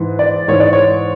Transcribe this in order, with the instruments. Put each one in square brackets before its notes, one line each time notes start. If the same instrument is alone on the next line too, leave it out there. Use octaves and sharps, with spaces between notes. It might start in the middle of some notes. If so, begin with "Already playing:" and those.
Already playing: [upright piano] G#2 E3
D5
G#2 E3 C#5
D5
C#5